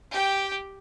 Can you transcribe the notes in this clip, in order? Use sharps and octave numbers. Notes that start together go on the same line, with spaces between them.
G4 G5